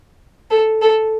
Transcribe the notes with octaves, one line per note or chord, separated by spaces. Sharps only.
A4
A4